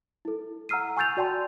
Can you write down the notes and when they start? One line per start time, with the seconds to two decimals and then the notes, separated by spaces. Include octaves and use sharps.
0.25 E4 A4
0.69 F#5 A#5 E6 F6 C7 D#7
0.97 G#5 C#6 E6 G6 A6 F7
1.17 F#4 D5 G5 A5 C6